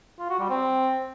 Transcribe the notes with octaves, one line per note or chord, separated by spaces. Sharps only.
F4
F#4
G3
C4